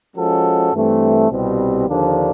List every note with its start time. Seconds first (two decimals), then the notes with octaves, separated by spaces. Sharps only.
0.15 F3 G#3 C#4 F#4 A4
0.73 G2 E3 A3 C4
1.30 C2 B2 G3 C4
1.88 D#2 D3 F3 A#3 D4